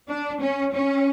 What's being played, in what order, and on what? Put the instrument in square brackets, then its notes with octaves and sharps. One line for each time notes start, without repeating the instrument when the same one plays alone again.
[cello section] D4
C#4
C#4